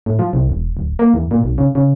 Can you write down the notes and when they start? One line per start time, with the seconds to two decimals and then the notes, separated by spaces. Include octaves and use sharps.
0.06 A2
0.19 F3
0.33 C2
0.50 E1
0.77 D1
0.99 A#3
1.14 E2
1.31 A#2
1.44 B1
1.58 C#3
1.75 C#3